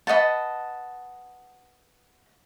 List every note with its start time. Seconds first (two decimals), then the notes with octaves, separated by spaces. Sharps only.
0.07 B4 D#5 F#5 A5